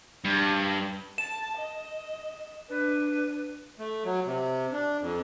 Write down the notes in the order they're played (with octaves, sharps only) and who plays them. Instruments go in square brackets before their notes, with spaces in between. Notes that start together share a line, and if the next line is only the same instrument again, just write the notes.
[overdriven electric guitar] G2
[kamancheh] A5 [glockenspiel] E7
[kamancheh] D#5
[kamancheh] D4 [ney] B4
[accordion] A3
F#3
C3
D4
F2